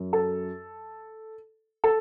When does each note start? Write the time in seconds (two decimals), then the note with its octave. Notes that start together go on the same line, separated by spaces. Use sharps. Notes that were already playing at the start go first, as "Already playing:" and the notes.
Already playing: F#2
0.13 A4
1.84 A4